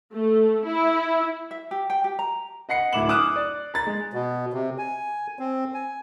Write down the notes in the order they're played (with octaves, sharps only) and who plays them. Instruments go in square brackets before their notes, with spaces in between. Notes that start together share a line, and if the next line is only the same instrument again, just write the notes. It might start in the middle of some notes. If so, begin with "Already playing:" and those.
[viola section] A3
E4
[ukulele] E5
G4
G5
G4
A#5
[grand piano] D#5 F#5 C7 C#7
D1 E4 D6 E7 F#7
D6 D#6 F6 F#6 E7
D5
A#5 A6
G#3
[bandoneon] B2
C3
G#5
C4
G#5